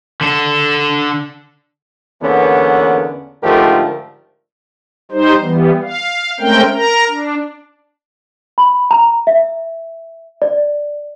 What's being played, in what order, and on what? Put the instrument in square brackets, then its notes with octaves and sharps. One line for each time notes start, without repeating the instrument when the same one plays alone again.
[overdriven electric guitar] D3 A4
[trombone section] E2 D3 A#3 B3 C#4
G#2 D3 F3 A3 G4 A#4
[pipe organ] G3 D#4 C5
E3 G3 B3
F5
G#3 A3 C4 C#4 A#4 G5
A#4 A#5
D4
[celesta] B5
A#5
E5
D5